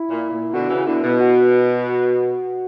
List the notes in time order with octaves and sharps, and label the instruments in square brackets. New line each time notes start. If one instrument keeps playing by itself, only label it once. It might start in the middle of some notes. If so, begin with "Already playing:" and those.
Already playing: [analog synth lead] E4
[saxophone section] A#2
A#2
[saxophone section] B2 D3 [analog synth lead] F#4
[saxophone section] C#3 E3
[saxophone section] B2 D3 [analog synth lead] E4
[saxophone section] B2
[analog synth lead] F#4
F#4
F#4